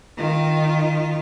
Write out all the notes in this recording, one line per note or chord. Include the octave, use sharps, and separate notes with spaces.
D#3 F4